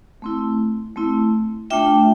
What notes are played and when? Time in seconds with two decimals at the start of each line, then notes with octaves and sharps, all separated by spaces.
0.22 A3 C4 E4
0.96 A3 C4 E4
1.70 A3 D4 F4 E5 G5